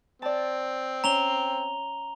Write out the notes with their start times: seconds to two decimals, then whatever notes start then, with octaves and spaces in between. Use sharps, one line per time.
0.22 C4 D5 A5
1.04 C#4 A#5 F7 G7